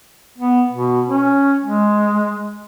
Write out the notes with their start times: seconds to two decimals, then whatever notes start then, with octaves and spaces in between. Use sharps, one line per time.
0.38 B3
0.72 B2
1.07 C#4
1.62 G#3